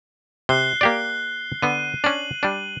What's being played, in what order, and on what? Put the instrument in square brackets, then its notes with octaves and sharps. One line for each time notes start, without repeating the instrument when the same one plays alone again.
[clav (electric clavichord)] C3 [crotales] F#6 C7 G7
[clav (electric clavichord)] A#3 G4 D5
[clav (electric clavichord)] D3 B3 [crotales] D#7
[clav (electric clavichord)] C#4 D4 [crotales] F#7
[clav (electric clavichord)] G3 D4